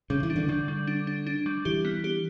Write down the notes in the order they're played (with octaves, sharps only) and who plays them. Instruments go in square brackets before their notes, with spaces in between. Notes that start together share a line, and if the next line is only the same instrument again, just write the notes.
[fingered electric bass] C#3 [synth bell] G3
[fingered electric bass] E3
[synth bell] D4
[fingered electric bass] D3
[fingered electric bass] D3 [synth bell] G3
[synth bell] G3
D4
D4
D4
G3
[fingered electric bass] E3 [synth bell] G4
[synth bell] B3
G4